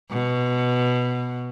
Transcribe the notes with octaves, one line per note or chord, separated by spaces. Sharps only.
B2